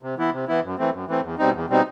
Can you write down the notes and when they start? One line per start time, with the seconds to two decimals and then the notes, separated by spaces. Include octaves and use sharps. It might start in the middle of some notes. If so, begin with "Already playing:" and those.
0.03 C3
0.18 E3 B3 E4
0.33 C3
0.48 E3 B3 E4
0.63 F#2
0.78 E3 A3 C4
0.93 F#2
1.08 E3 A3 C4
1.23 E2
1.38 B2 G3 C4 D#4
1.54 E2
1.69 B2 G3 C4 D#4